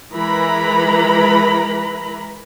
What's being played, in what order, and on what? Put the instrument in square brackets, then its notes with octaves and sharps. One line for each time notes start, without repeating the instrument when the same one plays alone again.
[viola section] E3 G#3 A#4 B4 A#5 B5